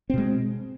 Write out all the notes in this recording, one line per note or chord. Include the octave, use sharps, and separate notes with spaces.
B2 G#3 C4